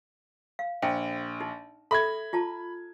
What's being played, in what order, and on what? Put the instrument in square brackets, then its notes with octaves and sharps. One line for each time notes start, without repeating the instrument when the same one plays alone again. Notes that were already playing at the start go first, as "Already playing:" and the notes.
[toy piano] F5
[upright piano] A#1 [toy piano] G5
[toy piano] D#4
[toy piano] A4 E5 [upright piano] B5 G#6
[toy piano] F4 A5 A#5